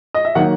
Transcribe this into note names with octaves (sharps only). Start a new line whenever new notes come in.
D#5
E5
D#3 F#3 A#3 F#5